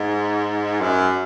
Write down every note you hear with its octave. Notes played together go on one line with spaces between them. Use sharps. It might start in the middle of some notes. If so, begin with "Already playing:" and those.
Already playing: G#2
F#2